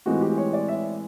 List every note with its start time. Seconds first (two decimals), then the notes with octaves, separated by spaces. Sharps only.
0.06 A2 E3 G#3 C4 F4 F#4
0.21 G4
0.38 C#5
0.53 D5
0.68 E5